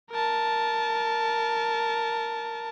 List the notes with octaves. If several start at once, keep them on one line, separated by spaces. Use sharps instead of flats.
A#4 A5